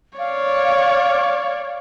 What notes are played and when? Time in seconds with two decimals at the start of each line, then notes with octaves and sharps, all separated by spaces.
0.19 C#5 D5 F5